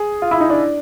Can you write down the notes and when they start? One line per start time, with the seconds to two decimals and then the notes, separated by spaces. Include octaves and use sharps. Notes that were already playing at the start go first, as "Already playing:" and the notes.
Already playing: G#4
0.22 F4
0.31 E4
0.40 D#4
0.50 D4